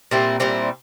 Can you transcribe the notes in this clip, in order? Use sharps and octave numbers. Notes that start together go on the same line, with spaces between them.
A#2 G3 C4 E4
A#2 G3 C4 E4